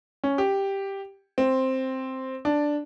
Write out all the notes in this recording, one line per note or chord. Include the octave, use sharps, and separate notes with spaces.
C#4
G4
C4
D4